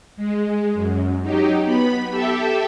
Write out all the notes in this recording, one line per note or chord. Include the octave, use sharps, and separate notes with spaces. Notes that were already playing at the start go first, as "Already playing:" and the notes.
G#3
F#2
F#3 D#4 G4
B3 B5
G4 A4 E5